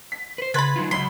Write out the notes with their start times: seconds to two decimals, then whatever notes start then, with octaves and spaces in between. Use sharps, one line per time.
0.12 B6
0.38 B4 C5
0.54 C#3 B4 B5 C6 G#6 A6
0.76 F#3 D#4 F4
0.91 C#2 F#3 B5 C6 B6